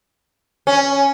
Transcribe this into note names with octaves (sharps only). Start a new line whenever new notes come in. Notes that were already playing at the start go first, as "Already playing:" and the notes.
C#4